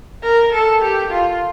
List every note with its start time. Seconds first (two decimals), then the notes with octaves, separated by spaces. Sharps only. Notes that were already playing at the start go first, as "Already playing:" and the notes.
0.23 A#4
0.53 A4
0.82 G4
1.11 F4